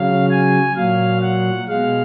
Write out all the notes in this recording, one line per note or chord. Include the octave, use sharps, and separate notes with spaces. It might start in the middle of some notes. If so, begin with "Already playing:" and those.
Already playing: C#3 F#3 F5
G#5
A#2 F#3 F5
F#5
B2 G#3 F5